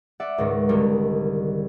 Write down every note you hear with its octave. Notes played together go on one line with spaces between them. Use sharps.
D5 E5 F#5
C#2 G#2 D#3
C2 D3 D#3 G3